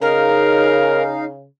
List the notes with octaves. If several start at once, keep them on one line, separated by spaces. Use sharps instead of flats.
C#3 D#4 A#4 F5